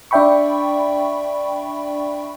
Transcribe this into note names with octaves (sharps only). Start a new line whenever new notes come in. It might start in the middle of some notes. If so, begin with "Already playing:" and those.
D4 D5 E5 G5 B5 C#6